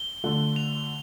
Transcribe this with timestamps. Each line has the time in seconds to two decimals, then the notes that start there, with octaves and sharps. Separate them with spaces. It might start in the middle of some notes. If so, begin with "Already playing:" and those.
Already playing: G7
0.24 D3 A3 F4 A4
0.56 F7